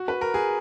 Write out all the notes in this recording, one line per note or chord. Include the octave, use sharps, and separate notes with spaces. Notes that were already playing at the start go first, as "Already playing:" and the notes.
Already playing: F#4
B4
A#4
G#4